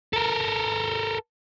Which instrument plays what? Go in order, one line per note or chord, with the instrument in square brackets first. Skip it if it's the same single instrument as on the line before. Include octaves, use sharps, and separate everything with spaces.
[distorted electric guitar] A4 A#4